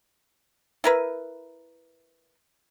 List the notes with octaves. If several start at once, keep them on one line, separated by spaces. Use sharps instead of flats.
E4 A#4 B4